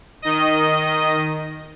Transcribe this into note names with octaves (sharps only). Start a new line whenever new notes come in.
D#3 D#5